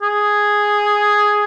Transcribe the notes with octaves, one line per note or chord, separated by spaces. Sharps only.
G#4